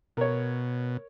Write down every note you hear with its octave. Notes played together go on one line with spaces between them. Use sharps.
B2 A#4 C#5